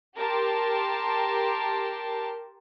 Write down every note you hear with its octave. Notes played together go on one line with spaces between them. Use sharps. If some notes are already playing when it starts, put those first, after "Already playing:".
G4 A#4 A5 C6